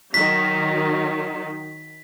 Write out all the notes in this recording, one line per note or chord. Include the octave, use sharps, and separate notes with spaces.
D#3 F#3 B6